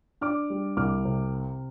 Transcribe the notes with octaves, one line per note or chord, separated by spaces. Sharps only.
D4 D6 F6
G3
C2 D6 F6
C3